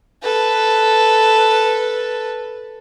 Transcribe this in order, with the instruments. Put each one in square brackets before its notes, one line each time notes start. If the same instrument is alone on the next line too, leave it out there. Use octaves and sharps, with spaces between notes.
[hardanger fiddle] A4 B4